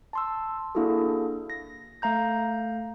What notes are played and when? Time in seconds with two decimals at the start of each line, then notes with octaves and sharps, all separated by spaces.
0.13 A5 C6 E6
0.75 A#3 D4 E4 F#4 G#4 A4
1.50 A#6
2.02 A3 F5 A#5 G6